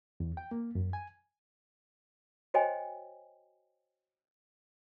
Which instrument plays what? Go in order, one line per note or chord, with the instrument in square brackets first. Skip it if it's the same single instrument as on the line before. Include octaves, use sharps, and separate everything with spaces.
[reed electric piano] E2
G5
A#3
F#2
G#5
[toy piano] F#4 C5 C#5 D#5 G5 G#5